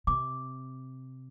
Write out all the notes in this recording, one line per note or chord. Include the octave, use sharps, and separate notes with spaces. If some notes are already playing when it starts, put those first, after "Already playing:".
C3 D6